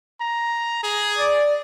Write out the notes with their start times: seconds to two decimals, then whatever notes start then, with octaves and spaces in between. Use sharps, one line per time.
0.20 A#5
0.83 G#4
1.18 D5